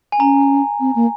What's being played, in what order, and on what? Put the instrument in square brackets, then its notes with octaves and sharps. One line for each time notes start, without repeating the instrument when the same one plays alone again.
[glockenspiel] G#5
[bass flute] C#4 [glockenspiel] A#5
[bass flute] C4
A#3